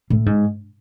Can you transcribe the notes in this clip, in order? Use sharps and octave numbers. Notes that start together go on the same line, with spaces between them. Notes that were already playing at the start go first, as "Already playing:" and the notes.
A2
G#2